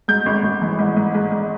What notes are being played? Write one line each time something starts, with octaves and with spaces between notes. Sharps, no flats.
G#2 G6
G#1
G#1
E3
G#2
G#2
G#2
G#2